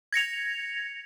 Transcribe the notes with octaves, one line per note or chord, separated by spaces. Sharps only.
G#6 A#6 C#7 F7